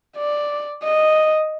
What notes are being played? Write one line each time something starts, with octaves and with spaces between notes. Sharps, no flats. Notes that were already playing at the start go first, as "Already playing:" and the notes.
D5
D#5